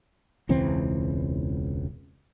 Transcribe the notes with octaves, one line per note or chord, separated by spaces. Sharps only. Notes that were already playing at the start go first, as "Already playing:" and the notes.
E1 C#2 E3 C4